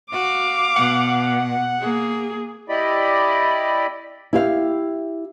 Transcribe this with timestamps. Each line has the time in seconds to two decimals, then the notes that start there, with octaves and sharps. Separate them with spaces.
0.12 F#4 F5 D6
0.76 B2 F#5
1.81 A#3 G#4
2.69 E4 G4 D5 D#5 B5
4.33 E4 G4 F5